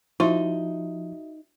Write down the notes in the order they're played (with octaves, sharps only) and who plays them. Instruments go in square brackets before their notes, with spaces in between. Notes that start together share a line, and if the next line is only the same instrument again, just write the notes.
[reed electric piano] F3 [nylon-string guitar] D#4 [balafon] E4 C6 [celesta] F#4 E5